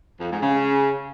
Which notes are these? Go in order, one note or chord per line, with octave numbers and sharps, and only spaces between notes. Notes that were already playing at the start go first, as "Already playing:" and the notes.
F2
G#2
C#3